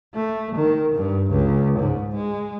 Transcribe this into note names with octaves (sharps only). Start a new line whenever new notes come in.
A3
D#3
G2
C#2
G#2
G#3